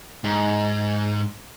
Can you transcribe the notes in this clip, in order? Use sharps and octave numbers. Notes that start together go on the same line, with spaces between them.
G#2